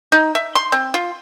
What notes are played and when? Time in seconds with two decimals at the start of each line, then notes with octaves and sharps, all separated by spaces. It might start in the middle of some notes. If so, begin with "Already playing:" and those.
0.12 D#4
0.35 E5
0.55 C6
0.72 C4
0.94 F4